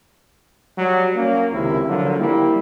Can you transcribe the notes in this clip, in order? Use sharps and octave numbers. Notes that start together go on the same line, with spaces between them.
F#3 G3
A#3 C#4
C#2 C3 D#3 E4
D3 F3 F#3 A#3
G3 A#3 E4